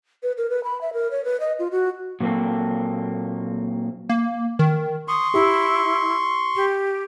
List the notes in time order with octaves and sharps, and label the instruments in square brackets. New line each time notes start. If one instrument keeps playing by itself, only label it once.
[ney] B4
A#4
B4
B5
E5
A#4
C#5
B4
D#5
F4
F#4
[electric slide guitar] A#2 F#3 A#3 C4 A4
[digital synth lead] A#3
D#3
[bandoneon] C6 C#6 [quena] D#6
[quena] E4 [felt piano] G4
[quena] G4